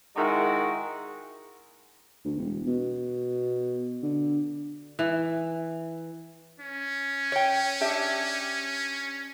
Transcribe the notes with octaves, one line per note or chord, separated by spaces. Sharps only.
D#3 G#3 D#4 E4 F#4
D2
E1
B2
D3
E3
C#4
C#5 G5
D4 G4 E5